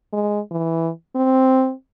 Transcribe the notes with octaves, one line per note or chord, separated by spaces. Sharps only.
G#3
E3
C4